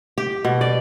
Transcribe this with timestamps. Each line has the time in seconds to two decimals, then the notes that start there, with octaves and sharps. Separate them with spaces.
0.18 G4
0.45 B2
0.61 D5